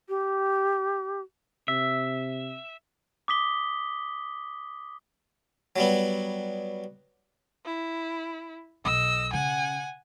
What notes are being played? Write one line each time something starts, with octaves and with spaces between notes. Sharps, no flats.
G4
C3 E5
D6 D#6 B6 G7
F#3 G3 B3
E4
B1 D#5 E6
C#3 F#5 G#5